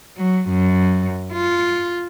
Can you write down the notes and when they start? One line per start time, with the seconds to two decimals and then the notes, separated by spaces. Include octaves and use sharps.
0.17 F#3
0.49 F#2
1.33 F4